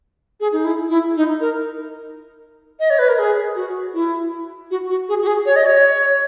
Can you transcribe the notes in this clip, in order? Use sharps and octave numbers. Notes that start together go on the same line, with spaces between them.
G#4
D#4
E4
E4
D#4
A#4
D#5
C#5
B4
A#4
G#4
F#4
E4
F#4
F#4
G#4
F#4
G#4
C#5
D#5
C#5